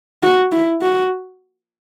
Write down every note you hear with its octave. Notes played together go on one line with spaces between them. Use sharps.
F#4
E4
F#4